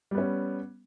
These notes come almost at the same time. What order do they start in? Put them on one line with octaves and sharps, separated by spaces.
G3 B3 C#4